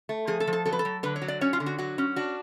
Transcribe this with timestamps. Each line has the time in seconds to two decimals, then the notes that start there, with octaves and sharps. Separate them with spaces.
0.09 A3
0.27 F3 G#4
0.40 A4
0.47 F3
0.53 A4
0.66 F#3 A4
0.73 B4
0.79 A4
0.85 F#3
1.03 D3 B4
1.16 C#5
1.22 F#3
1.28 D5
1.41 C#4 C#5
1.53 F4
1.60 D3
1.66 F#4
1.78 F#3 F#4
1.98 C#4
2.16 D4 F#4